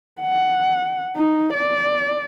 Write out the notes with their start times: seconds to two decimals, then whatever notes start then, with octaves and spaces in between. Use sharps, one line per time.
0.22 F#5
1.16 D#4
1.54 D5